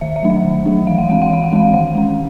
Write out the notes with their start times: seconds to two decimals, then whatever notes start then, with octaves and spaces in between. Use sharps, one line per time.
0.01 D#3 E5
0.16 E5
0.23 F#3 A3 D4
0.30 E5
0.45 D#3
0.66 F#3 A3 D4
0.87 E3 F5
0.98 F#5
1.09 G#3 C4 F5
1.22 F#5
1.31 E3 F5
1.44 F#5
1.52 G#3 C4 F5
1.74 D#3 F#5
1.95 G#3 C#4